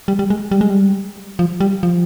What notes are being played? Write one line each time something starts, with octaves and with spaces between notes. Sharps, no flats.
G3
G3
G#3
G3
G#3
G3
F3
G3
F3